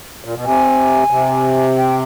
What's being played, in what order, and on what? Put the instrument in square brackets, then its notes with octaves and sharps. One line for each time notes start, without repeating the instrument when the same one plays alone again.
[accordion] A#2
B2
[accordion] C3 [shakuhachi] G#5
[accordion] C3
[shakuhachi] G5